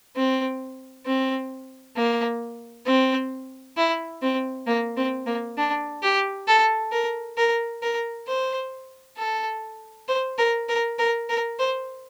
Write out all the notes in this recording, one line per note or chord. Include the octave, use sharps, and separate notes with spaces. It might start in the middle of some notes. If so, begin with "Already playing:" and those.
C4
C4
A#3
C4
E4
C4
A#3
C4
A#3
D4
G4
A4
A#4
A#4
A#4
C5
A4
C5
A#4
A#4
A#4
A#4
C5